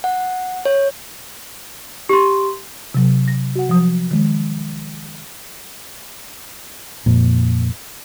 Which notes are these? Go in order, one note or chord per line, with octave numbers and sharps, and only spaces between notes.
F#5
C#5
G4 C6
C3 F#3
A#6
F#4 F#5
F3 F#3 D#6
D#3 G#3
F2 A#2